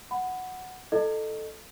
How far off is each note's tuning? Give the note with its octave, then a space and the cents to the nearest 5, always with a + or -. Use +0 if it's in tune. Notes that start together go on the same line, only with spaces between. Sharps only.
F#5 +0 B5 +30
E4 +0 A4 +0 D#5 -25